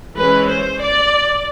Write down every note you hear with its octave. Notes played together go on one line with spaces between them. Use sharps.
E3 G#3 C#4 B4
C5
D5